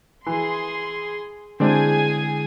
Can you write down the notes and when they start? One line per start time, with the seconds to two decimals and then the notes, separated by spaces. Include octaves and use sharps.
0.26 E3 G#4 C6
1.60 D3 G#3 C4 D4 E4 G#4 G#5